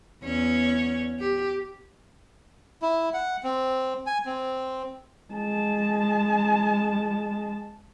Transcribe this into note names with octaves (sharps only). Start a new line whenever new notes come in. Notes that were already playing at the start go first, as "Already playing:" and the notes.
E2 C#4 C#5
G4
E4
F#5
C4
G#5
C4
G#3 A5